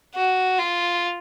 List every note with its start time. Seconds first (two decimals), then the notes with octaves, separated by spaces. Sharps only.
0.15 F#4
0.59 F4